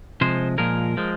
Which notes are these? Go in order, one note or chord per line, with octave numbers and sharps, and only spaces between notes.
C3 F3 G#3 C5
A#2 F3 G#3 A#4
F3 G#3